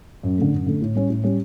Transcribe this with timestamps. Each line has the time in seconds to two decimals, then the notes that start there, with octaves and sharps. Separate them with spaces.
0.23 F#2
0.38 D3 A3
0.53 F#2
0.66 D3 A3
0.82 A2
0.95 G3 C#4
1.10 A2
1.24 G3 C#4